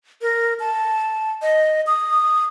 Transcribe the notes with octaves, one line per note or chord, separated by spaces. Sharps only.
A#4
A5
D#5
D#6